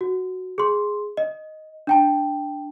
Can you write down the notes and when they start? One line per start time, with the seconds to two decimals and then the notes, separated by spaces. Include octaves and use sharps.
0.01 F#4
0.58 G#4 C6
1.17 D#5
1.87 D4 G5 A5